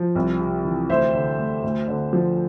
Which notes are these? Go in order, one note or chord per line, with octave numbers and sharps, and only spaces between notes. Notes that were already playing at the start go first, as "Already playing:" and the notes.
Already playing: F3
C2
C3
E3
D2 C5 E5
D3
A3
D2
D3
F3